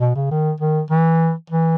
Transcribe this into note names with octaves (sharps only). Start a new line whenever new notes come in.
B2
C#3
D#3
D#3
E3
E3